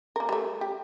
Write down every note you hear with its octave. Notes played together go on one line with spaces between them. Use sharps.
A#3 A#4
G3 A3
G4